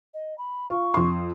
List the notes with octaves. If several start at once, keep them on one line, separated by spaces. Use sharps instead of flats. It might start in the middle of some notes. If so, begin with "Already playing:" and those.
D#5
B5
F4 C#6
F2 C6